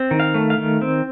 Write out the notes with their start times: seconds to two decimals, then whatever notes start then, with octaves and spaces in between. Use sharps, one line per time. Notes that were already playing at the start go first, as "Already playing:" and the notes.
Already playing: C4
0.11 D#3
0.20 F5
0.34 A3
0.50 F5
0.58 D#3
0.82 C4